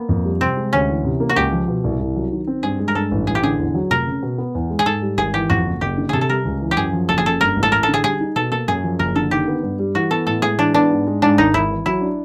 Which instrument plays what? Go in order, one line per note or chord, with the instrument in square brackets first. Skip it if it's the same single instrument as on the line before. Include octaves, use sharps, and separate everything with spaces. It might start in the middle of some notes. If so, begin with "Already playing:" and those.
Already playing: [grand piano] A#3 [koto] B3
[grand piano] F2
G3
[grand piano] C3 [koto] C4
[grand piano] G#3
[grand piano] D2 [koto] C#4
[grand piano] E3
C3
A#3
[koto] F#4
[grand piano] C#2 [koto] G4
[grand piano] F3
B2
C2
C2
F#3
D#3
C4
[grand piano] G2 [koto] G#4
[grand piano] G#3
[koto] A#4
[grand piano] G2 [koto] A4
[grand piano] A1
[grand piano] A1 [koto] G#4
[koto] G4
[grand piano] D3 [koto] G#4
[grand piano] E2
F#3
[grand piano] F1 [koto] A#4
[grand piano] C#3
B2
B3
E2
G#3
[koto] G#4
[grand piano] G#2 [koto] A4
[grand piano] G3
[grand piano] G#1 [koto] G#4
[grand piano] E3 [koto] G4
[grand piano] F2 [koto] F#4
[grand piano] F#1
[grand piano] F#1 [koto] G4
[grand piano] D3
[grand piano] C3 [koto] G#4 A4
[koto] A4
[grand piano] G3 [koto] A#4
[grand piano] C#2
E3
[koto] G4
[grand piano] F#2 [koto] G#4
[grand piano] F3
[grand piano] F#1 [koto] A4
[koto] G#4
[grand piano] C#3 [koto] A4
[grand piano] G2 [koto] A#4
[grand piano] A1
[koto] A4
[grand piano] A1 [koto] A#4
[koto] A4
[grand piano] D3
[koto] G#4
[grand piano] G3 [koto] G#4
[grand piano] D#4
[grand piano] B2 [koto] A4
[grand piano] A#3 [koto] A4
[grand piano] F#2 [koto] G#4
[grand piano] F3
[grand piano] F#1 [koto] A#4
[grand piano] D3 [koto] A4
[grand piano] D#3 [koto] G4
[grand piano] B3
G2
G3
[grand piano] E3 [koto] F#4
[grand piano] B3 [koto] A4
[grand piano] A2 [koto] A4
[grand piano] G#3 [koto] G#4
[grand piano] E3 [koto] D4
[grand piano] B3 [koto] D4
[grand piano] G#2
G#3
[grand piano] G#2 [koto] D4
[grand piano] G#1 [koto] D#4
[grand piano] G#1 [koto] E4
[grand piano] E3
[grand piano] F#3 [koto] E4
[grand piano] D4